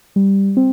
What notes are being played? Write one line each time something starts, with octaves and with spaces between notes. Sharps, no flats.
G3
C4